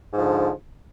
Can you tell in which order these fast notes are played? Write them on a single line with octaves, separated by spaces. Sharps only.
G#2 F3 D3